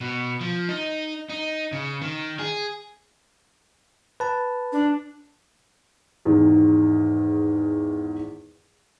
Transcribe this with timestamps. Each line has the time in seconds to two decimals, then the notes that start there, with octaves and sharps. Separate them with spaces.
0.01 B2
0.41 F3
0.69 D#4
1.29 D#4
1.72 C#3
2.02 D#3
2.39 G#4
4.20 B4 A5
4.73 D4
6.25 E2 G#2 D#3